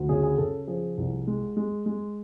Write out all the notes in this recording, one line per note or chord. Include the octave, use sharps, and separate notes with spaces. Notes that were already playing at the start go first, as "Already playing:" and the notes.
Already playing: D2
C#3 G#4
G#4
C#3 A4
F3 G#4
C2
G#3
G#3
G#3